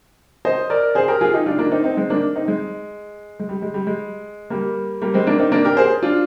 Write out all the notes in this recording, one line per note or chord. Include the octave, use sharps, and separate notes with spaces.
C5 D#5
A#4 D5
G#4 C5
G4 A#4
F4 G#4
D#4 G4
D4 F4
A#3 D4
C4 D#4
C4 D#4
G#3 C4
A#3 D4
C4 D#4
G#3
G#3
G3
G#3
G3
G#3
G3 A#3
G3 A#3
G#3 C4
A#3 D4
C4 D#4
A#3 D4
G4 A#4
G#4 C5
D4 F4